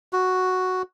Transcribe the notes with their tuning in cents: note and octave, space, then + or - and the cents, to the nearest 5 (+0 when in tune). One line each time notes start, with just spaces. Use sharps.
F#4 +0